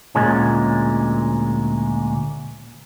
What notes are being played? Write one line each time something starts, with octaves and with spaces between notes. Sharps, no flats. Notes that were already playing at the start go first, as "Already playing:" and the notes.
D2 A#2 G#3 C#4